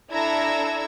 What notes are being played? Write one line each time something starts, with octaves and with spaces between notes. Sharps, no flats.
D4 E4 A4 A#5 E6 G#6